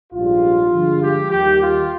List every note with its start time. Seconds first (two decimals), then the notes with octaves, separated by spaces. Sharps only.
0.12 A#1 G#2 G3 F4
0.72 G2 D3 F3 G#3
1.02 G4
1.31 D#2 D#3 G3 G4
1.60 F4